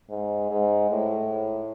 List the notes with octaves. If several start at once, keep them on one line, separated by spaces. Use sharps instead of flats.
G#2
G#2
A2